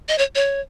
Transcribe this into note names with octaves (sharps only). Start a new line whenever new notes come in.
D#5
C#5
C#5